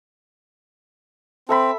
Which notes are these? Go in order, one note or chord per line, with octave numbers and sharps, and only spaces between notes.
C4 A4 E5 B5